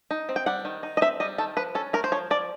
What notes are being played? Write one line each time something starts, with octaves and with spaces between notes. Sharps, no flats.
D#4
C4
G5
G3 F#5
D#3
D#4
D#5
C4 E5
G3 D#5
D#3 A4
F3 B4
C#4 A4
A3 A#4
C5
F3 C#5
F3 D5